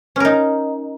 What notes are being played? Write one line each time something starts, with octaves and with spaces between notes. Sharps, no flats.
C#4 D#4 A#4